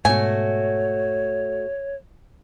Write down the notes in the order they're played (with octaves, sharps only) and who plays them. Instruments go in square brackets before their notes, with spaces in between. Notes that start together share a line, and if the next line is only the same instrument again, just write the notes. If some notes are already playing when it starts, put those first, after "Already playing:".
[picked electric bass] G#2 B2 [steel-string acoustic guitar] A3 F#4 [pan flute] C#5 [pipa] G#5